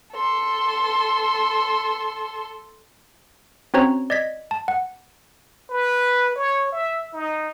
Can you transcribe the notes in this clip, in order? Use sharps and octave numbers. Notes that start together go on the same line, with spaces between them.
A4 C6
C4 C#4 F#4 C5 C#5 A#5
D5 D#5 G#6 B6
A5
F#5
B4
C#5
E5
D#4